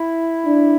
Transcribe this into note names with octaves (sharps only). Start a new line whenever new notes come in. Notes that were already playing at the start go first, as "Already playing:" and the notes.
Already playing: E4
D4